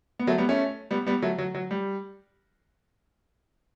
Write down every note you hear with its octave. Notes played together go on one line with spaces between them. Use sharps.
B3
F#3 A3
G3 B3
A3 C#4
G3 B3
G3 B3
F#3 A3
F#3
F#3
G3